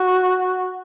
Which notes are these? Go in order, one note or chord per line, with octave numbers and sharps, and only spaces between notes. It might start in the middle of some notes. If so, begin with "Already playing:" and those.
Already playing: F#4